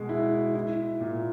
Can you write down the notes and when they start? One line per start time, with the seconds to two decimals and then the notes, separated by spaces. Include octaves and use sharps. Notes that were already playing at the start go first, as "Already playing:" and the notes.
Already playing: B2 G#3
0.09 E4
0.55 E4
1.01 A#2